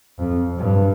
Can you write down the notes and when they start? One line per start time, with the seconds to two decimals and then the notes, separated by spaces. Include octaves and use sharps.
0.19 F2
0.58 G2